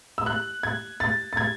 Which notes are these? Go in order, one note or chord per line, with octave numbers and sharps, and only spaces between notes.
E6
F#6
G#6
A6
A6
G#6